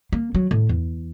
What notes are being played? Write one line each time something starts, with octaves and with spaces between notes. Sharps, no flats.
A#3
F#3
A2
E2